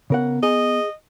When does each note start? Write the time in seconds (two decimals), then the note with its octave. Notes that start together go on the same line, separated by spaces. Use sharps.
0.10 C#3 B3 A#4 F#5
0.43 G#4 D#5